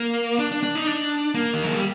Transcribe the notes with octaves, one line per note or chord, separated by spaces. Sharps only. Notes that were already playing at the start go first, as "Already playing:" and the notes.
Already playing: A#3
D4
D4
D4
D#4
D4
A#3
D#3
F#3
G3